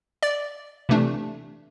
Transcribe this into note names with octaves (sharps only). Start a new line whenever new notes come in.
D5
C3 E3 A3 D4